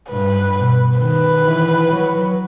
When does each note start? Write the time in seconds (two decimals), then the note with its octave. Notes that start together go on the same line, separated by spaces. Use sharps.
0.10 G2 B4
0.56 B2
1.00 D#3 B4
1.45 E3
1.90 F#3